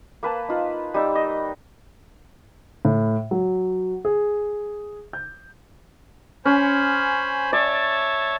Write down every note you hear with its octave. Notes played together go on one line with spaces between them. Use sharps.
A#3 B4 A5
D#4 F4
G3 D#4 E5
D#5
A2
F#3
G#4
G6
C#4 C5 G#5 B5
C#5 D5 E5 A5